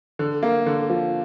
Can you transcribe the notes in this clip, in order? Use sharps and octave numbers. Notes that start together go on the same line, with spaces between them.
D3
A#3
D3
F3